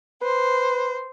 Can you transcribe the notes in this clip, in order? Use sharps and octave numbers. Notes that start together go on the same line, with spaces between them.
B4 C5